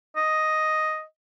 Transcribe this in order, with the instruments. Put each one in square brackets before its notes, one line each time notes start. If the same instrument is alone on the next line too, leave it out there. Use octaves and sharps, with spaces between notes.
[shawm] D#5